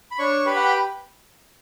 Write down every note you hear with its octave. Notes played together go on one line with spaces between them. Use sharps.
B5
D4 C#5 C#6
G4 B4 B5
F#5
G5